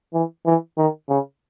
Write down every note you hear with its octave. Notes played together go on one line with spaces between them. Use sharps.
E3
E3
D#3
C#3